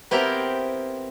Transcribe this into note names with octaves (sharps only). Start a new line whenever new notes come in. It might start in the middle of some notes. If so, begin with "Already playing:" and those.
B3 C4 E4 F4 G4 A#4